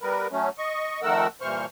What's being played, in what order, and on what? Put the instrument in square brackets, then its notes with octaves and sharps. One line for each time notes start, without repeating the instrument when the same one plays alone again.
[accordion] G3 B3 A#4 B4
F#3 A3 C#4
D#5 C#6
F2 D#3 A3 A#4 F#5 E6
G2 A#2 E3 C5 C#6 F6